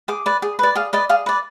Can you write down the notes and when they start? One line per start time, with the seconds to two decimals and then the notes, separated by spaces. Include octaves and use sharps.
0.08 G#4 D6
0.26 B4 D5
0.42 G#4
0.59 B4 D5
0.75 G#4 F5
0.93 B4 D5 D#5
1.09 G#4 F5
1.26 B4 D5